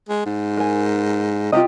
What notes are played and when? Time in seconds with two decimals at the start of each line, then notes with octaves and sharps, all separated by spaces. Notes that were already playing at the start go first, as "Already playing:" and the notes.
0.09 G#3
0.26 G#2
0.57 A#4 G#5
1.52 C3 F4 G4 D#5